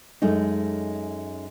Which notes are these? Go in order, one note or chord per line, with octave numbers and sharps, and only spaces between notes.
F#2 G#3 A3 D#4